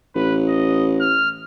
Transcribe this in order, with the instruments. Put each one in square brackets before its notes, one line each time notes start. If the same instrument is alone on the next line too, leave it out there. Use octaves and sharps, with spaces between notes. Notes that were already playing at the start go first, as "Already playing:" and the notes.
[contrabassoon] A1 [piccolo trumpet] B4
[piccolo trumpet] D#5
F6